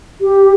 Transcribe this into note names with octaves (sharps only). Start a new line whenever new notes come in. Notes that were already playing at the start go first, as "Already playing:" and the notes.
G4